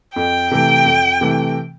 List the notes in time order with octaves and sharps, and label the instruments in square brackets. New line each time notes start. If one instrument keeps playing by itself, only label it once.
[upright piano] F2 [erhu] G5
[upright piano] C3 E3 A3
F2
C3 E3 A3